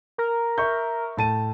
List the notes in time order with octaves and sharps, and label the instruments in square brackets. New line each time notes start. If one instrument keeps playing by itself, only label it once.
[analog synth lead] A#4
[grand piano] E5 C#6 G6
A2 A5 D#7